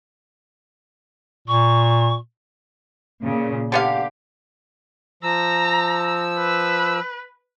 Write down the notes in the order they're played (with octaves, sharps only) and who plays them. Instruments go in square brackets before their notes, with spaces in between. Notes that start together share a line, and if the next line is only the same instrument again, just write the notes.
[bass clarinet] A#2 [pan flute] C#6
[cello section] A#2 C#3
[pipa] D3 B3 F5 [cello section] G4
[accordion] F3 E6 [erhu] A#5
[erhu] B4